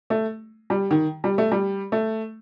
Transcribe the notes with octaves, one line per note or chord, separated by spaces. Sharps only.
A3
G3
D#3
G3
A3
G3
A3